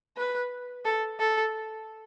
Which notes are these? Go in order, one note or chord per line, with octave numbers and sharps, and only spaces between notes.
B4
A4
A4